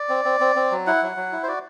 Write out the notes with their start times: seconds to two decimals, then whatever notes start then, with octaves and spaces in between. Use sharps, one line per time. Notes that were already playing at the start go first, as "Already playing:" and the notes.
Already playing: D5
0.09 C4
0.25 C4
0.40 C4
0.56 C4
0.71 F#3
0.87 E4 F#5
1.02 F#3
1.17 F#3
1.32 E4
1.43 C5
1.48 F#4 D5